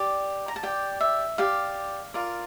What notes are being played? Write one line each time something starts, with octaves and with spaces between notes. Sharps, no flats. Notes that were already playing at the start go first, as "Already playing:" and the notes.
Already playing: G4 D5
A#5
A5
G4 D5 G5
E5
G4 D5 F5
F4 A#4 D5